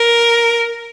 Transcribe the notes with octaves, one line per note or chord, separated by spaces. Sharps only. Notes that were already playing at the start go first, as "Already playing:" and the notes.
Already playing: A#4